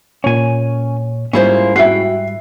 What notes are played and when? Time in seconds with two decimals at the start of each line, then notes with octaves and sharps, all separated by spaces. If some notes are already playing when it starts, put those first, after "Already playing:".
0.24 A#2 C#4 C#5 G#5
1.33 G#2 G3 A#3 C#4 E4 F4 G#4 C5
1.76 F#4 E5 G5 C7